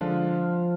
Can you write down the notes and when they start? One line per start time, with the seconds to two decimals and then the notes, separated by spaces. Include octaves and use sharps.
0.01 D3 F3 G#3 D4 F4